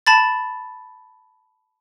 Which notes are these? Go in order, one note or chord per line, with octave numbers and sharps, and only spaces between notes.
A5 B5 A6